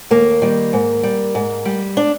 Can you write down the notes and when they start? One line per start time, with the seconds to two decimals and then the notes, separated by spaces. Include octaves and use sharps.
0.11 D#2 A#3
0.42 D#3 G3
0.73 G#2
1.03 G3
1.35 G#2
1.65 G3
1.97 D4